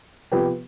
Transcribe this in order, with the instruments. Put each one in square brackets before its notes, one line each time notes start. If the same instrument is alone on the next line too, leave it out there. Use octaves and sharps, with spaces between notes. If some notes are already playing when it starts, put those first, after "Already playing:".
[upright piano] C3 F3 B3 F4 G4 B4